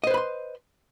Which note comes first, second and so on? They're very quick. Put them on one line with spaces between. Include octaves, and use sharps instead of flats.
D#5 C5 B4 B5 C6